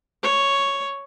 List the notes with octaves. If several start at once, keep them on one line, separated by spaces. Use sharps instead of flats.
C#5